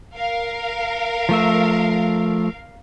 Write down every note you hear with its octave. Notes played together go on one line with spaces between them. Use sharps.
A#4 F5
F3 A3 E5